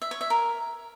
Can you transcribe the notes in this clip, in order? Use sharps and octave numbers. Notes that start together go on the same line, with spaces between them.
E5
C#5
E5
A#4